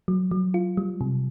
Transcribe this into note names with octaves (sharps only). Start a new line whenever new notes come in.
F#3
F#3
F4
G3
C3